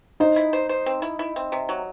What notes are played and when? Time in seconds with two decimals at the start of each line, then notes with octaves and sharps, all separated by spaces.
0.20 D#4 C5
0.36 E4
0.53 C5
0.69 C5
0.86 C4
1.02 E4
1.19 E4
1.36 C4
1.52 C3
1.69 F#3